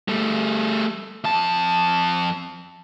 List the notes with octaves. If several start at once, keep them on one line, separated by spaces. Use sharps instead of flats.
G3 A3
F2 A5